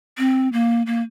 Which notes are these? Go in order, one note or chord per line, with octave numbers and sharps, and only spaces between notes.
C4
A#3
A#3